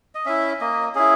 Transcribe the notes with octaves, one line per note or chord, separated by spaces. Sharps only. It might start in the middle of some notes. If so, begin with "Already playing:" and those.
D#5
C#4 E4 E5
A#3 D#5
C#4 E4 G#4